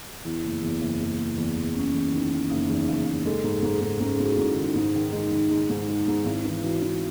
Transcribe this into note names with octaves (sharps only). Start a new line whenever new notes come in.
E2 E4
F#1
E2
F#1
F#1
F#1
E2
E2
F#1 C#4
E2
D#3
D#3
F#1 D#4
E2
F#1
F#1
G#3 A4
G#2
G#2 G#4
G#2
G#2 C#4
G#4
G#2 F#4
E4
G#2 D#4
D#3
G#2 D#4
D#3
G#3
D#3
G#3 D#4
G#2
G#3
G#2
G#1 E4
E3
E3 F#4
E3